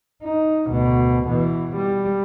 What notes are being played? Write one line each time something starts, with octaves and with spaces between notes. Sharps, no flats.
D#4
D2 B2
B2 E3
G3